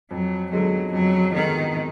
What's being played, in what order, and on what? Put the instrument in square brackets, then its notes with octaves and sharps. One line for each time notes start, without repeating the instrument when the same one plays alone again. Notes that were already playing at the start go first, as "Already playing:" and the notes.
[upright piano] F2 [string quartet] F#3
[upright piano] D3 G#3 B3 [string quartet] F#3
[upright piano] F2 [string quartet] F#3
[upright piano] D3 G#3 B3 [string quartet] D#3